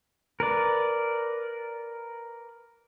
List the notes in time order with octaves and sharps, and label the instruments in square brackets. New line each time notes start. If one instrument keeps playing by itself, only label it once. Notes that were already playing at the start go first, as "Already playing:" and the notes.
[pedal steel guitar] A#4 B4 D5